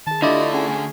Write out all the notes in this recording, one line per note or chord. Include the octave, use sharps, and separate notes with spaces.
D#3 G#4 A5
D3 A3 D4 E4 F4 G4 D5 D#5
C#4 G#4 F#5 G#5